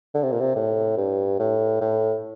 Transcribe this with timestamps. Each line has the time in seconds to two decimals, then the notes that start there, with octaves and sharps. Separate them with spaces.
0.14 D3
0.23 C3
0.32 A#2
0.40 C3
0.56 A2
0.97 G2
1.39 A2
1.81 A2